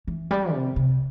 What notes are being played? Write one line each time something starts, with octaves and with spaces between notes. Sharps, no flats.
E3
G3
C3
C3